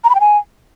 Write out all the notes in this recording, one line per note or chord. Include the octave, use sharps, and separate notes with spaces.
A#5
B5
G5
G#5